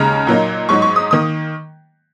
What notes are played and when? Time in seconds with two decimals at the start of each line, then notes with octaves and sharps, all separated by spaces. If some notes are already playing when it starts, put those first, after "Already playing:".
Already playing: D#2 C#3 G#3 D#4 A#5
0.27 A#2 F#3 A#3 D#4
0.69 G#2 F#3 D#4 C#6
0.82 C#6
0.96 D#6
1.11 D#3 A#3 D#6